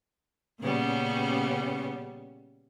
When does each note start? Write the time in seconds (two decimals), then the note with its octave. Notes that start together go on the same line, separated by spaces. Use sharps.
0.60 A#2 C#3 G3 B3 C#4